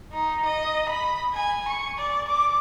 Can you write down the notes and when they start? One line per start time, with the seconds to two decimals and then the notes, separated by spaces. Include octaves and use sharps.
0.12 D#4
0.45 D#5
0.89 B5
1.34 G#5
1.68 C#6
1.98 D5
2.28 D6